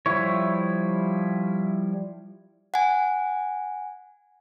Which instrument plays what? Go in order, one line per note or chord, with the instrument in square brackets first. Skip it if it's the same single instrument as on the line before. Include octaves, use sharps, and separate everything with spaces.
[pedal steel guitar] F3 G3 E4 C#5
[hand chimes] F#5 G#5